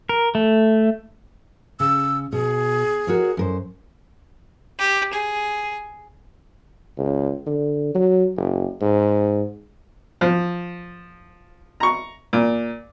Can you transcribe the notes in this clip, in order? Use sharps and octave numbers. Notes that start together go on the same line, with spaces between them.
A#4
A3
C#3 E6
B2 G#4
F#4 A#4 C#5
F#2 A#4 C5
G4
G#4
C#2
D3
F#3
F#1
G#2
F3
A#5 C#6
A#2